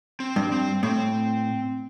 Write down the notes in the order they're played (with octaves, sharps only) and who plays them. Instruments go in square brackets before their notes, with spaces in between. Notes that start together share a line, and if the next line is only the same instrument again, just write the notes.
[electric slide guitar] C4
[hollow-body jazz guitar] G2
[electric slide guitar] C4
[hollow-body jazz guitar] A2 [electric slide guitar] C4